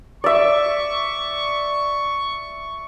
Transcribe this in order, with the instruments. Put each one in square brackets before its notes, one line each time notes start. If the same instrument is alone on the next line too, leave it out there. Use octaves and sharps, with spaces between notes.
[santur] D5 E5 [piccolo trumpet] C#6